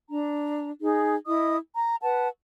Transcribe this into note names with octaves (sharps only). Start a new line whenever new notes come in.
D4 A#5
D#4 G#4
E4 D#5 D#6
A#5
B4 F#5 A5